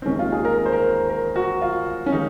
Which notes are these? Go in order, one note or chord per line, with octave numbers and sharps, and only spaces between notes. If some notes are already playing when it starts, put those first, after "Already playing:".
C4
D#2 D#3 G#3 C#4
F4
G#4
A#4
A#4
C5
A#4
A#4
F#4
F4
C#4
D#3 G#3 D#4